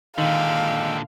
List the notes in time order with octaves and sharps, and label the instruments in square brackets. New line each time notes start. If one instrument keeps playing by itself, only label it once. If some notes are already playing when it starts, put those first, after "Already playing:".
[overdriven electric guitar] A#2 D3 [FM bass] D#3 [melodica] G#3 G5 E6 [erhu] F5